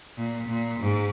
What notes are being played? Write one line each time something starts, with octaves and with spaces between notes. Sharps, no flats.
A#2
A#2
G#2